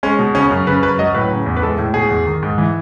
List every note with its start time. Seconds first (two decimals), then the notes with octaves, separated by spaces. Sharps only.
0.03 G#3 C#4
0.19 B2
0.35 C#3 C#4
0.51 F#2
0.67 C#3 B4
0.82 F#2 B4
0.99 F#3 D#5
1.14 A2 B4
1.31 C#3
1.46 E2
1.57 B4
1.62 G#3 A4
1.78 A2
1.94 B2 G#4
2.10 E2
2.26 D#3
2.42 G#2
2.58 E3